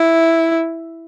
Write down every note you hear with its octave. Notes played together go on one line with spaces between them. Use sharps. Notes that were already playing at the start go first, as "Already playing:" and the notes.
Already playing: E4